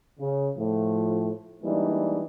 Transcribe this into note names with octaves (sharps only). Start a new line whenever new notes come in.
C#3
A2 F3 A3
E3 G3 G#3 A#3 D4 D#4